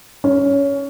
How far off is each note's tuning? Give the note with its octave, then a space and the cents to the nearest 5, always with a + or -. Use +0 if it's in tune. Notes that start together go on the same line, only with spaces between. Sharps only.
C#4 +15